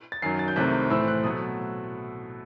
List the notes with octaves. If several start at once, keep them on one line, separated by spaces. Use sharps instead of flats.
A6
F#2 D#3 F#3 C7
A6
G6
C2 C3 D#3 A3 C4 F#6
A2 E3 A3 C4 E6
F#6
B2 F#3 A3 D#6